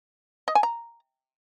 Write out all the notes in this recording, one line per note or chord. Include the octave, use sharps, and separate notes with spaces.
D#5
G#5
A#5